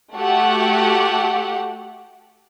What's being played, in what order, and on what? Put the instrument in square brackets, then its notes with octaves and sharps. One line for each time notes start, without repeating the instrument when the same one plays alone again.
[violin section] A3 F#4 G4 F#5